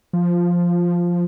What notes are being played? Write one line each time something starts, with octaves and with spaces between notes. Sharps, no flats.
F3